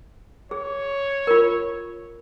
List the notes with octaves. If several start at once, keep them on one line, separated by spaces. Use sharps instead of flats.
G#4 C#5
F4 A#4